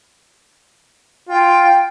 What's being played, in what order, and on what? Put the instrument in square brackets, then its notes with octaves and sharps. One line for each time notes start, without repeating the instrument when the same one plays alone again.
[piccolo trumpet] F4 [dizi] G5